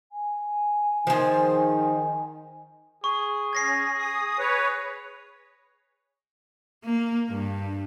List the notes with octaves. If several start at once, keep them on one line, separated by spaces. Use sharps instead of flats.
G#5
D#3 F3 G#4
G#4 C#6
C#4 G#6 A#6 C7
D#6
B4 C#5
A#3
G2